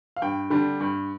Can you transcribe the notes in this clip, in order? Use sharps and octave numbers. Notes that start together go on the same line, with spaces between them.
F5
G2 G5
D3 G3 D4
G2